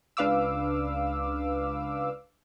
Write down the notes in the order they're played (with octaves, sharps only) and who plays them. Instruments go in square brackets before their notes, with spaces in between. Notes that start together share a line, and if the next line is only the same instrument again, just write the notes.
[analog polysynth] C#2 D4 B4 F5 D6 E6